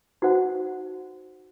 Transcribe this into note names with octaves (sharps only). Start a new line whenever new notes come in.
D#4 F#4 C5 F#5